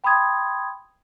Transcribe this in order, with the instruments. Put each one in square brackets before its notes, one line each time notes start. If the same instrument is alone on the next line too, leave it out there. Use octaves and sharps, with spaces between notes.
[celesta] G5 B5 C6 D#6 G#6